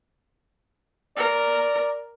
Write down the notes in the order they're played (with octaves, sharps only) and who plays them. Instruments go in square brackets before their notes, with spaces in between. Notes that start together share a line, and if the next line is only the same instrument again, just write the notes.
[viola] A#4 [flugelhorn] D5